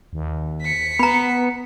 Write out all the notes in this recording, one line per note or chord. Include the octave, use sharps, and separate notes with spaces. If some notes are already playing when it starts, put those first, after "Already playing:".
D#2
B6 C#7
B3 A#5 B5